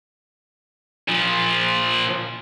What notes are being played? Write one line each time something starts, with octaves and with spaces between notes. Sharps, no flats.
A#2 F3